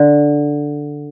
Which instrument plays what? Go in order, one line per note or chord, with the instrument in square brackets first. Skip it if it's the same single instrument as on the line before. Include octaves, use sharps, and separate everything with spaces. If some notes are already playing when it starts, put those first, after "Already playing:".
Already playing: [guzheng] D3